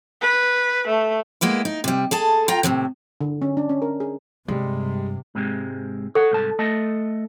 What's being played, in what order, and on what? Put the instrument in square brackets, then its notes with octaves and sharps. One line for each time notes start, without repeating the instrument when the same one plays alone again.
[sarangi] B4
A3
[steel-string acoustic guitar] G#3 A#3 B3 E4
D#4
C3 G3
G#4 A4 A5
F4 G5 A#5
D#2 A2 C3 D#3
[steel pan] D3
C#4
D4
C#4
A#4
G#4
[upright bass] G2 [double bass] C3 [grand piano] G3 G#3
[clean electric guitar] G#2 C3 G#3
[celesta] A4 [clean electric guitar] C#5 F#5
[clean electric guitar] C2 G#2 A5
A3 D#5 A5